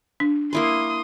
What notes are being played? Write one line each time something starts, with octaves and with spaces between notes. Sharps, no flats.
D4
A#3 E4 B4 C6 D#6